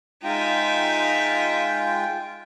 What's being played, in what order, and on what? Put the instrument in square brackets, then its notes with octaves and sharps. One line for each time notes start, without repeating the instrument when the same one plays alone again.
[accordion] G#3 F4 G5 [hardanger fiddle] D#4 E5